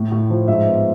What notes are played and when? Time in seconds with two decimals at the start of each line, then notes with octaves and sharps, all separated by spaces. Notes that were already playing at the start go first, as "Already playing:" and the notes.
Already playing: A2
0.12 A2
0.30 F3
0.48 G#2 E5
0.67 B3